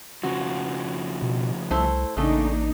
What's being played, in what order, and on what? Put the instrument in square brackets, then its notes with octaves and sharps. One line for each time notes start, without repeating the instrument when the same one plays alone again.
[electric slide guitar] F2 C#3 F3 [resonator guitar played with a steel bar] F#4
[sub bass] B2
[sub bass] C2 [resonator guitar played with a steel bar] A3 E4 C5
[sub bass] A1 [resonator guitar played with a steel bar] C#3 A3 [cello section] A#3 D4 D#4